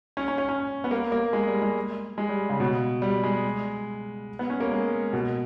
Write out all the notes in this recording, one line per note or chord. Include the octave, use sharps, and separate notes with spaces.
C#4
C#4
C#4
C#4
B3
A#3
A#3
G#3
G3
G#3
G#3
G3
C#3
B2
G3
G#3
B3
C#4
A#3
G#3
B2